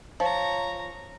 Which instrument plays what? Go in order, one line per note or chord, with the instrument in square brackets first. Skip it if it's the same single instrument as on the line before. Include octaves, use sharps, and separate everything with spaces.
[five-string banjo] F3 [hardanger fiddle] C#5 A#5